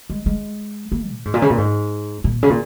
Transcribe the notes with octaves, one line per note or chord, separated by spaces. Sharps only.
G#3
G#3
A#3
A#2
G#2
A#2
C#3
A#2
G#2
A#2
C#3
A#2